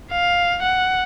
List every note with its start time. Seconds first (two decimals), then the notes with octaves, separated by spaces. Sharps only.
0.12 F5
0.63 F#5